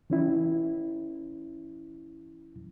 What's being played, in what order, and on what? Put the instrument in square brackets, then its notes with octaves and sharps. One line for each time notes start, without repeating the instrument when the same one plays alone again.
[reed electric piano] E3 C#4 E4